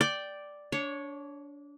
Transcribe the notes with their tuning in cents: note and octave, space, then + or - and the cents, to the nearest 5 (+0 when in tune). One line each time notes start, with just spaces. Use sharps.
D5 +0 G5 -5 D6 +0
D4 -25 C#5 +0